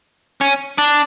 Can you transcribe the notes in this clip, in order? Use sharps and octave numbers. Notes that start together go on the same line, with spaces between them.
C#4
D4